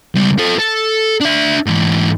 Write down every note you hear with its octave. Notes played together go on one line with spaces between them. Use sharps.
C#2 G3
F4 A4
A4
D4 E5
G#2 E3